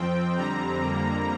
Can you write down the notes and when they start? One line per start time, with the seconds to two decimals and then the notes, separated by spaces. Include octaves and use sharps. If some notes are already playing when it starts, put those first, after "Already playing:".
Already playing: F2 F3 C4 G5
0.36 F2 D3 G3 C4 A#5
0.81 F2 D3 G3 A#3